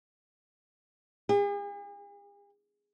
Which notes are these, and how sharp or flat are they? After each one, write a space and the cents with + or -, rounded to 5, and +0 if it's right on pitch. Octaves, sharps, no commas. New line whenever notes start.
G#4 -45